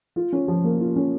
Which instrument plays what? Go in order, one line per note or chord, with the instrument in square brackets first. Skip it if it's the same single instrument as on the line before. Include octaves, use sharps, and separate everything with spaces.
[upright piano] F4
C#4
F3
A#3
F4
C#4